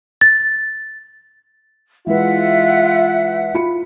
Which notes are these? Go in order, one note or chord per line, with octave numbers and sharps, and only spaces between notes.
A6
E3 G#3 F4 B4 E5 F#5
F4 B5 C#7